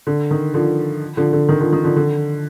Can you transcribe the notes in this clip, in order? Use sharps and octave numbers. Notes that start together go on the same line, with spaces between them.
D3
D#3
D3 F3
D3 F3
D3
D#3
D3 F3
D#3
D3 F3
D3